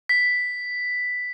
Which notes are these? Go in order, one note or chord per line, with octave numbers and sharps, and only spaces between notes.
B6